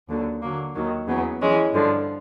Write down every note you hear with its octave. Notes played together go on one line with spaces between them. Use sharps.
D#2 D3 F#3
D3 F#3 A#3
D#2 D#3 F#3
E2 C#3 F#3 B3
E3 G#3 C#4
G2 D3 F3